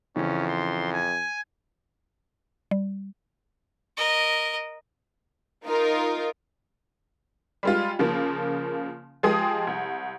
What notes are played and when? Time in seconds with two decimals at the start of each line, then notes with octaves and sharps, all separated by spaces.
0.16 F2 C#3 E3 C#4
0.48 C6
0.93 G#5
2.71 G3
3.97 A#4 D#5
5.65 D#4 F4 A#4
7.63 G3 G#3 F4
7.99 C#3 F3 A#3
9.23 F3 G#3 G4 G#4 D#6
9.67 C2